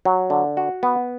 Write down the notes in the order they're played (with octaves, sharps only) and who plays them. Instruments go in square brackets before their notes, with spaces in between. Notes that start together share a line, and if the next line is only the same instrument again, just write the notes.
[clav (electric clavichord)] F#3
D3
F#4
B3